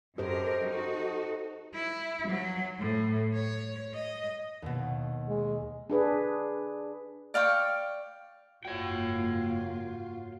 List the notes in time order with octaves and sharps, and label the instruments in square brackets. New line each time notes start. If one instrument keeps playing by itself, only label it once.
[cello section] F#2 A#4 [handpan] G4 C5 [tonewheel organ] A4 D#5
[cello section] D#4 F#4
[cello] E4
F#3
A2
C#5
D#5
[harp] D#2 B2
[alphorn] G#3
[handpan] D4 G#4 B4
[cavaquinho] D5 F5 G5 C#6
[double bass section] F#1 G#2 A#3 [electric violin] F4 [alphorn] F#4 [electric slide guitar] C#5 G5